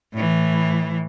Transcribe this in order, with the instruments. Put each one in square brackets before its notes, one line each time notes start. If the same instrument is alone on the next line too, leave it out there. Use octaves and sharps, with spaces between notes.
[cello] A2 E3